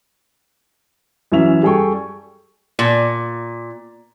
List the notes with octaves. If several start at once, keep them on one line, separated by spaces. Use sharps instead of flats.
F#2 E3 C#4 E5 F7
G3 G#4 A4 G5 C#6
A#2